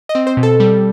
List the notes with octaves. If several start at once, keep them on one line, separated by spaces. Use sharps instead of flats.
D#5
C4
C5
B2
A4
G3